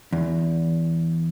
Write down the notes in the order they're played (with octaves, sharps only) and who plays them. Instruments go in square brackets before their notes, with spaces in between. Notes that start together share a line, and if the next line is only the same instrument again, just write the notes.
[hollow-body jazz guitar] E2